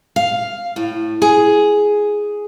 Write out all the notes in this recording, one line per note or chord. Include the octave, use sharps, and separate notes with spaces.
F5
A2
G#4